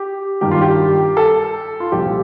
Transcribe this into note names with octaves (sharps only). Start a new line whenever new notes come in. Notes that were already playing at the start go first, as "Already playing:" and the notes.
Already playing: G4
G2 D#3 G4
F4
G4
A4
F4
C2 A#2 F3 G4